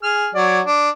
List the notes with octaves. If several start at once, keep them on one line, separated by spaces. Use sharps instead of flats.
G#4 F6
F#3 D5
D4